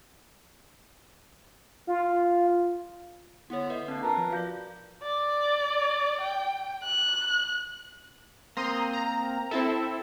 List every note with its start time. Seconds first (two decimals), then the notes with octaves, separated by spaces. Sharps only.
1.87 F4
3.50 D3 B3 E4 C#5
3.70 B4 D#5 E5
3.88 D3 A#3 C4 D4 E5
4.03 F4 A#4 B4 A5 A#5
4.17 F3
4.32 F#4 D5 F5 G6 A#6
5.02 D5
6.21 G5
6.83 F#6
8.57 A#3 C4 A#5 C6 D#6
8.93 A#5
9.51 C4 E4 A4 E5